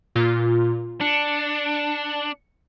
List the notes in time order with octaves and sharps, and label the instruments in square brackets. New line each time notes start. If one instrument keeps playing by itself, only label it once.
[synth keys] A#2 F4
[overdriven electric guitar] D4 [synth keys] C#7